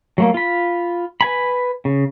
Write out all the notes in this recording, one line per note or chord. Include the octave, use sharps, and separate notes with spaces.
F#3 A3 A#3
F4 B5
B4 G#5 B5
C#3